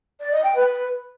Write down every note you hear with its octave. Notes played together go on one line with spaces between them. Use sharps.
D5
D#5
G5
B4